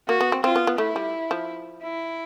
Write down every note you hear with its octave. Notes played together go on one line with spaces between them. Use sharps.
A#3 F#4
B3
C4
C4 F4
B3
B3
A3 E4
G3
F3
E4